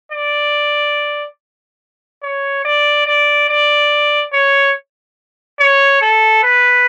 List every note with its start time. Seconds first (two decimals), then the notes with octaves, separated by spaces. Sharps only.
0.12 D5
2.22 C#5
2.65 D5
3.07 D5
3.49 D5
4.33 C#5
5.59 C#5
6.01 A4
6.43 B4